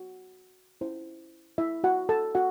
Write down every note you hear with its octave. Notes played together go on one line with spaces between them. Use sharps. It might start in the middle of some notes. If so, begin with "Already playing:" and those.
Already playing: F#4
C#4 E4 C5
E4 E5
F#4 F#5
A4 A5
F#4 F#5